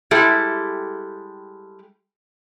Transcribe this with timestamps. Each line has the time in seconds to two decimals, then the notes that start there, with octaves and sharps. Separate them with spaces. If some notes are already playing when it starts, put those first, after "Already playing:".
0.11 G3 G#3 E4 G4 A4